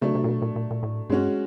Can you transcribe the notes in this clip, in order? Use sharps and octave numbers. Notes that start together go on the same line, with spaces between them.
C#3 F#3 A3 D4
C3
A#2
B2
A#2
A#2
A#2
A2
G2 G#3 C#4 F#4